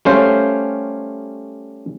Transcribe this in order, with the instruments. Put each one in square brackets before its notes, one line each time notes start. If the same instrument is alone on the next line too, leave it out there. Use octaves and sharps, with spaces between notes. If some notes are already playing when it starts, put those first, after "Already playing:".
[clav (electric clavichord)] G3 A3 C#4 C5 C#5 F5